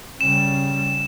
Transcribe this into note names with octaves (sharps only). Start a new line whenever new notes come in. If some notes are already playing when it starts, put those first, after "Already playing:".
C#3 G3 E7